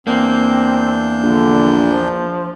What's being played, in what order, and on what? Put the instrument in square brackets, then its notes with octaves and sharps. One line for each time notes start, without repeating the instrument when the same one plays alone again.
[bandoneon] E2 D4 G6 [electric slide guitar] A#3 [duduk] C4
[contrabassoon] A#1 [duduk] D3
[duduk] F3